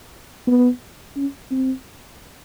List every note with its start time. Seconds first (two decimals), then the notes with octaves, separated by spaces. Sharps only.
0.47 B3
1.16 C#4
1.51 C4